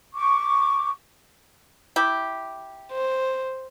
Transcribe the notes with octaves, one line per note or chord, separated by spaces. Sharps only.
C#6 D6
E4 G4
C5